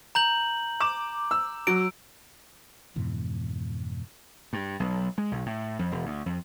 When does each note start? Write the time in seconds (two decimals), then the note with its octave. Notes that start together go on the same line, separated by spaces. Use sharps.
0.15 A#5 G6 F#7
0.80 D6 E7
1.31 E6
1.67 F#3 D7
2.96 F2 G#2 B2 E3
4.53 G2
4.80 B1
5.18 G#3
5.32 B1
5.46 A2
5.79 F2
5.92 E1
6.05 D2
6.26 F2